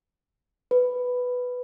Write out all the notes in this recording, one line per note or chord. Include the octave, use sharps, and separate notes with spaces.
B4